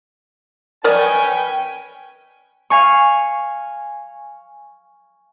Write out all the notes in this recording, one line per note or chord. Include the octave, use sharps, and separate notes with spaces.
C#4 A#4 B4 D5 D#5 G5 G#5
F5 G#5 C#6